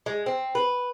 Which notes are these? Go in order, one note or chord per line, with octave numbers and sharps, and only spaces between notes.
G#3
C4
B4